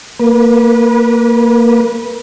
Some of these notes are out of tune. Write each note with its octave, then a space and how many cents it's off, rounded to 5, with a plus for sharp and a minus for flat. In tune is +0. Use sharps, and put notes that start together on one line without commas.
A#3 -15 B4 -30